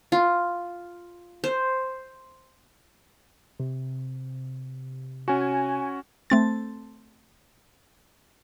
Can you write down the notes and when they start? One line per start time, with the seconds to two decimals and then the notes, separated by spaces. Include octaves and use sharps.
0.12 F4
1.44 C5
3.60 C3
5.28 C#4 F#4 G#5
6.30 A3 C4 A6